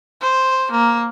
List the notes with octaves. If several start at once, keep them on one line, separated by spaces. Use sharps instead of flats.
C5
A#3